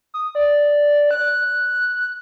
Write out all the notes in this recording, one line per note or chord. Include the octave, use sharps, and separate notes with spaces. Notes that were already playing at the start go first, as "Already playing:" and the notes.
D#6
D5
F#6